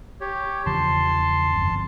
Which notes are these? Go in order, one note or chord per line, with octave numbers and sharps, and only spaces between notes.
G4 C#5
E2 C#3 F3 A5 C6
G1 F2